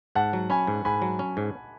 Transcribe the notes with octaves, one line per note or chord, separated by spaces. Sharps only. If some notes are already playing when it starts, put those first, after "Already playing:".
G#2 F#5 A5
F#3
C#4 G#5 B5
G#2
G#2 G#5 B5
F#3
C#4
G#2